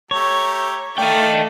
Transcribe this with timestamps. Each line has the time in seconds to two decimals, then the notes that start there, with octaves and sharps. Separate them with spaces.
0.11 A3 G4 C#5 A#5
0.98 A3 D5 D#5 F5 G5